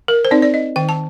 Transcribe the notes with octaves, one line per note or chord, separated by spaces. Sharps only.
A#4
C5
C4 D#4 D5
D5
D#5
D#3 G5
A5